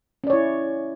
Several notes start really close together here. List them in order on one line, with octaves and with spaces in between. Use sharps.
C#4 D5 C#5 E4